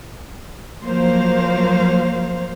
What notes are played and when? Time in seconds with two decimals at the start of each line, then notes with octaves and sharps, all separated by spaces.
0.83 F3 F#3 A#3 C5 F5